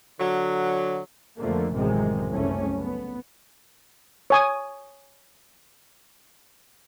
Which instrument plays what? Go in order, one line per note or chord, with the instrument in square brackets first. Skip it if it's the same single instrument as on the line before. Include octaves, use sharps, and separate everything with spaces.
[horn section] D3 F#3
[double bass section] F2 D3 F3 A3 A#3
A1 F#2 C3 D#3 G#3
F#1 C2 F#2 A3 C#4
B3
[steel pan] C#5 G#5 D#6